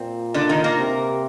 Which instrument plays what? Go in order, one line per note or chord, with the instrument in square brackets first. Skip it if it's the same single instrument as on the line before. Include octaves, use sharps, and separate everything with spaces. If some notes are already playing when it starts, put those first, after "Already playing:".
Already playing: [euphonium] A#2 [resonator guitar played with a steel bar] C4
[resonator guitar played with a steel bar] D3 D4
D#3 D#4
A#3 A#4
[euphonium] C3